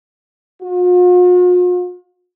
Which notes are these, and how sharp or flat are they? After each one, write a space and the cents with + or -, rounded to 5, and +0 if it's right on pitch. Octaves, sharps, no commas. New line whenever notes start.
F4 +45